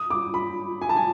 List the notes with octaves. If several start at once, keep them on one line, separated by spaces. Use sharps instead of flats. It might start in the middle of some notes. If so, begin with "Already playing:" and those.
Already playing: D#6
D6
B5
G#5
A5
G#5